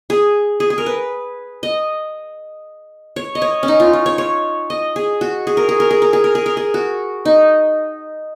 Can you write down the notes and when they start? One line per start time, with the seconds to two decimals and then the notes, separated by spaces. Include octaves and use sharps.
0.10 G#4
0.60 G#4
0.70 G#4
0.78 A#4
0.86 B4
1.63 D#5
3.16 C#5
3.35 D#5
3.42 C#5
3.63 C#4
3.68 D#4
3.80 F4
3.93 F4
4.06 C#5
4.18 C#5
4.70 D#5
4.96 G#4
5.21 F#4
5.47 G#4
5.57 A#4
5.69 G#4
5.80 A#4
5.91 G#4
6.02 A#4
6.13 G#4
6.24 A#4
6.35 G#4
6.46 A#4
6.57 G#4
6.74 F#4
7.25 D#4